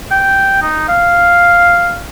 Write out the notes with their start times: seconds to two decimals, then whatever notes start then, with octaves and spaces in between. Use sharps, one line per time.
0.11 G5
0.62 D#4
0.89 F5